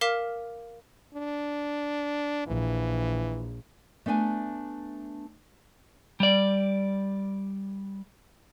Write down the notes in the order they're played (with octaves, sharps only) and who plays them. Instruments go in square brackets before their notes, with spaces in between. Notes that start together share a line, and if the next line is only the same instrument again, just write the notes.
[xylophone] A#4 F5 D6 F6 B6 E7
[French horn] D4
[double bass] A#1 [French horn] E3
[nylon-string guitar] A3 B3 D4 G5 G#5
[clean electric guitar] G3 D5